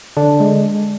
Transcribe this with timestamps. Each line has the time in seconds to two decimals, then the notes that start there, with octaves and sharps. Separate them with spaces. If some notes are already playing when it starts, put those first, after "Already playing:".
0.17 D3 D4
0.40 G#3